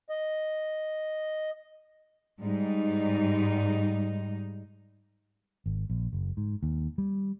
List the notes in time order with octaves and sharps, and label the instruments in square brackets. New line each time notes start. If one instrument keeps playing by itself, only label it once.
[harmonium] D#5
[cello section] G#2 G3 D#4
[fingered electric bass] G#1
A#1
F#1
G#2
D#2
G3